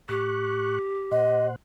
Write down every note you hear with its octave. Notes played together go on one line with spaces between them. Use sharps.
A2 G4 C#6 F#6
A#2 C5 D#5 F#5